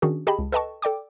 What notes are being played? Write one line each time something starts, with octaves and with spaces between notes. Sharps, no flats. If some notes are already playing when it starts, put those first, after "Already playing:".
D#3 C#4 D4 F#4 G#4
G4 G#4 D#5 G5 A5 B5
C#2
A4 B4 D#5 G5 A5 C#6
A4 D5 G5 D6